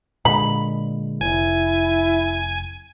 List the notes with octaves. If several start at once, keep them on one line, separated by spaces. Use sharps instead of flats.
A#2 D3 G#3 B5
F1 E4 G#5